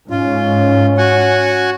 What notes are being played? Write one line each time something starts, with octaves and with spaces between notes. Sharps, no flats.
G#2 C#4 F4
F#4 F#5 G#5